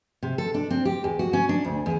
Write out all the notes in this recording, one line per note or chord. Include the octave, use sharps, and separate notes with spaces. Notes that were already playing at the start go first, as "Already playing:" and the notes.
C3
A4
D4
C4
G4
E2
F#4
C#4
D4
D2
E2